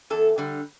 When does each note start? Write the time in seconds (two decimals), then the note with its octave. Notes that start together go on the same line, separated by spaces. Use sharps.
0.10 E2 A4
0.38 D3 G3